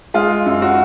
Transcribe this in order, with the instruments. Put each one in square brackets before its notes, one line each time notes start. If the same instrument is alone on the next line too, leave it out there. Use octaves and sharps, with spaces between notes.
[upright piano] G#3 F4
F#2
F#4